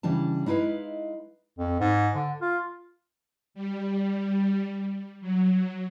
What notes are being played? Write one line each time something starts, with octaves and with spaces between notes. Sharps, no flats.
C#3 E3 G3 D4 A5
G#3 D#4 E4 B4 F5
F2
G#2
D3
F4
G3
F#3